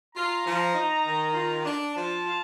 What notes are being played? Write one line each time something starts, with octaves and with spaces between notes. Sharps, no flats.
F4 A#5
F3
D#4
D#3
F4
D4
F3 A5
F4